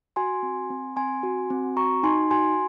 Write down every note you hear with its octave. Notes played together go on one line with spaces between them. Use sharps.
F#4 G#5 C6
C4
C4
C4 G#5 C6
F#4
C4
F#4 A#5 C#6
D#4 G#5 C6
F#4 G#5 C6